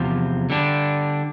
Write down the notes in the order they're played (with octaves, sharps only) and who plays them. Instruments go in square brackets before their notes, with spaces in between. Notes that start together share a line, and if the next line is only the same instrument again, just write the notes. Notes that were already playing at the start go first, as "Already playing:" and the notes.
Already playing: [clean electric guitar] E2 C3 F3
D3 G3 D4